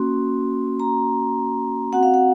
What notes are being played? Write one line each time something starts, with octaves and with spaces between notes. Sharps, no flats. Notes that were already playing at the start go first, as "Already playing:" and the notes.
Already playing: A#3 C#4 F#4 C6
A#5
C4 F#4 F#5
F5
F#5